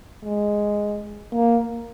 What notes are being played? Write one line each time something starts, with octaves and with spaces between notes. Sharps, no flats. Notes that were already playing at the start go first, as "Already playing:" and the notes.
G#3
A#3